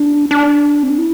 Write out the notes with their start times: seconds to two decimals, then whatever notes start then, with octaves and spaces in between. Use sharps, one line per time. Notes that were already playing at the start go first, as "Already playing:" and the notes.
Already playing: D4
0.31 D4
0.83 C4
0.90 D4
0.98 E4